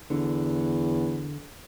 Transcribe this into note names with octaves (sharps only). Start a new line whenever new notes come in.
E2 D3